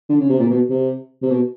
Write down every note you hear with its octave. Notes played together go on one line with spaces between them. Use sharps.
D3
C#3
C3
A#2
B2
C3
C3
B2